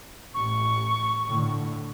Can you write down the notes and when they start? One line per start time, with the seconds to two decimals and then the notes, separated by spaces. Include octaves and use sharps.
0.34 A1 C#6
1.29 A2 D3